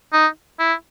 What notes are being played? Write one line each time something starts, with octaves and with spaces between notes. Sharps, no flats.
D#4
E4